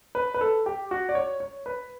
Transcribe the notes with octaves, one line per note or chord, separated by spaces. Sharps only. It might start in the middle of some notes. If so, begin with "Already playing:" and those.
B4
B4
A4
G4
F#4
D5
C#5
C#5
B4